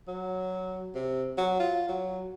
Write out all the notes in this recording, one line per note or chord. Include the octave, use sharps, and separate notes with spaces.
F#3
C3
F#3
F4
F#3